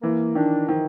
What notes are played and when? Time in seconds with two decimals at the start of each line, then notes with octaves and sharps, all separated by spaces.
0.02 E3 A#3
0.35 D#3 D4
0.69 D#3 F3